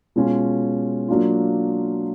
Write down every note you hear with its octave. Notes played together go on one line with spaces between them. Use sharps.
B2 G#3 C#4 F4
F#3 A#3 D4 F4